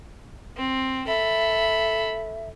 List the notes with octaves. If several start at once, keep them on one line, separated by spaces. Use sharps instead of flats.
C4
A4 E5 B5